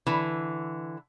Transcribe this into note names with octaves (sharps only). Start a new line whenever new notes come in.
D3 E3